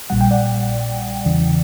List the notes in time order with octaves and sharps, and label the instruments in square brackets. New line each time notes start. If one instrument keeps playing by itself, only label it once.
[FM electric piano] A#1 A#2 G3 F#5
G5
D5 F#5
E2 C#3 E3